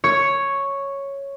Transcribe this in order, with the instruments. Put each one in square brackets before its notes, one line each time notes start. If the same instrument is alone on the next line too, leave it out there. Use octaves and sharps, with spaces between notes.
[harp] C#5